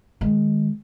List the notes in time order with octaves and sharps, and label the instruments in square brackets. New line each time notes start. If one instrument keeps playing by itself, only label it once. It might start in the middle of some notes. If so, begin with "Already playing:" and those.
[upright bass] D#3 G#3